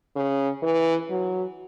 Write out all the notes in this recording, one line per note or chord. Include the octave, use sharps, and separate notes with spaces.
C#3
E3
F#3